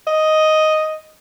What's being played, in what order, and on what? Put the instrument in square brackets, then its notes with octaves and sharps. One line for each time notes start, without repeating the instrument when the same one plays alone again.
[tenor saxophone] D#5